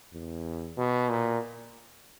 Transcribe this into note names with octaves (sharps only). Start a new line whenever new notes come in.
E2
B2
A#2